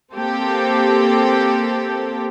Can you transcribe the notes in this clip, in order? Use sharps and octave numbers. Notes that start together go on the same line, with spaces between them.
A#3 C4 G4 A4